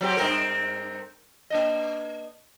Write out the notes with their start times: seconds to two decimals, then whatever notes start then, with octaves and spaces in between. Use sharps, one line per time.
0.01 F#3 C4 G4
0.17 G2 C4 A#4
1.50 A#3 D4 D#5